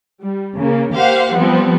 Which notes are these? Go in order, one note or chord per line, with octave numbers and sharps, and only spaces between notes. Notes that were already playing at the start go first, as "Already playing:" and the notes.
G3
C#3 A#3
A#3 G4 C5 F5 F#5
F3 G3 B3 C4